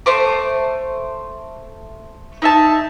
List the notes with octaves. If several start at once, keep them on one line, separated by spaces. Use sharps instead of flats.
A3 C5 D6
D#4 E5 A5